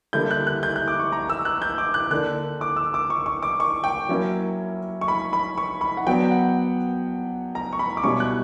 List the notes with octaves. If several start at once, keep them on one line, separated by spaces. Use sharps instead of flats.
D3 G3 A#3 E4 G6
F#6
F#6
G6
F#6
D6
C#6
A#5
E6
F#6
G6
D6
F#6
D3 A#3 D4 F#6
D6
E6
D6
C#6
C#6
D6
C#6
G5
F#3 A#3 C#4 E4
C#6
B5
B5
C#6
B5
F#5
F#3 B3 D4 G5
F#5
A#5
C#6
B5
D6
B2 G3 C#4 E4 C#6
F#6